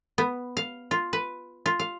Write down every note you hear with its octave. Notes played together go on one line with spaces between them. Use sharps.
B3
F5
F4
B4
F4
F5